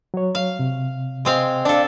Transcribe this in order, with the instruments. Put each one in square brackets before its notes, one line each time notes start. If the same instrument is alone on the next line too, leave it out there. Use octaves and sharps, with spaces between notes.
[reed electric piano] F#3 C#5
[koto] F5
[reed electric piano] C3
[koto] G#3 C4 F5
[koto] D4 A4 [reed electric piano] D5 F5